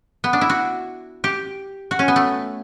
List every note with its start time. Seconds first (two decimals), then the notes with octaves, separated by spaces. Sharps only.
0.24 B3
0.33 D4
0.41 E4
0.49 F#4
1.24 G4
1.91 F#4
1.99 C#4
2.08 B3
2.16 A3